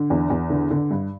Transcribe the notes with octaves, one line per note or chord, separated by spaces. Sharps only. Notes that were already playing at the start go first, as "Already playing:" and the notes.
Already playing: D3
E2
E2
D3
D3
G2